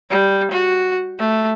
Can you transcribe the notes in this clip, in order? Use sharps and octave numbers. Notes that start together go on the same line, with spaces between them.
G3
F#4
A3